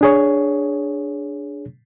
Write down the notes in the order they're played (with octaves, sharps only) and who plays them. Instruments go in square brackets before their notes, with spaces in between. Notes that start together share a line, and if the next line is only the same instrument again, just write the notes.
[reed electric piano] D4 G#4 C#5